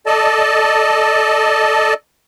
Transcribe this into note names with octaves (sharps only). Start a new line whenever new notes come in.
A4 D5 D#5 A5